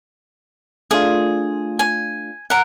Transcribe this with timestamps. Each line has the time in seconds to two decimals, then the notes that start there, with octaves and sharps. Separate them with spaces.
0.91 A3 D4 F4 G#4
1.79 G#5
2.50 A#4 F#5